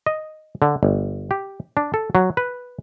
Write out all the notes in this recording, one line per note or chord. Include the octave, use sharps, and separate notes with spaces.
D#5
D3
G1
G4
D4
A4
F#3
B4